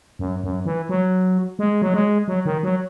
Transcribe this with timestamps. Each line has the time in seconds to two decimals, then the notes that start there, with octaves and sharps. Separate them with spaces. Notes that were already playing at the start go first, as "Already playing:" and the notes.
0.19 F#2
0.43 F#2
0.66 E3
0.89 F#3
1.59 G#3
1.82 F#3
1.94 G#3
2.28 F#3
2.45 D#3
2.63 F#3